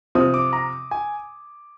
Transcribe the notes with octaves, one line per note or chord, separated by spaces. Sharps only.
C3 F3 C4 D#6
D6
A#5
G#5